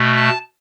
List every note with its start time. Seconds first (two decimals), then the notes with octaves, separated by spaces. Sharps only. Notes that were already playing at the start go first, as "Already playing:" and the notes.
Already playing: B2 A3
0.17 A5